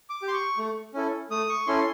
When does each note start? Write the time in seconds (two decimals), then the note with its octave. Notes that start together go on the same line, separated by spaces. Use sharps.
0.10 D6
0.22 G4
0.28 C6
0.33 C#6
0.57 A3
0.94 C#4 E4 A4
1.30 A3 D#6
1.49 C#6
1.67 C#4 E4 A4 C6